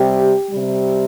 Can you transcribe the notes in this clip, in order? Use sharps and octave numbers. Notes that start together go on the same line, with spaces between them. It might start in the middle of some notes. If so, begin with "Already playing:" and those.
Already playing: C3 G3 G4
C3 G3